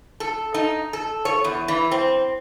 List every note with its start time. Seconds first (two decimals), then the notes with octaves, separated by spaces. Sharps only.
0.20 A4
0.54 D#4
0.93 A4
1.25 C#5
1.44 E2
1.68 E3
1.91 C4